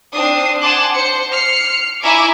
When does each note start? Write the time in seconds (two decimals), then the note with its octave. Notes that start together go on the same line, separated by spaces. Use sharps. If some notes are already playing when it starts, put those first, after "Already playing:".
0.14 C4 D4 D#6 C7
0.61 F#5 G#5 A5 C6 D6 F#6
0.95 C5 C#7
1.33 F6 C7 C#7
2.02 E4 E5 G#5 A#5 C#6 D6